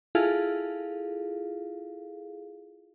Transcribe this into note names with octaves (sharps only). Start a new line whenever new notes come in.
E4 F4 G#4 A4 F5